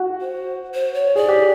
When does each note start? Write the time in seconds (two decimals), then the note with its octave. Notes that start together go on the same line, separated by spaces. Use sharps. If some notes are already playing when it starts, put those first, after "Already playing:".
Already playing: F#4
0.21 C5
0.74 C5
0.94 C#5
1.16 G#4 D5
1.29 G4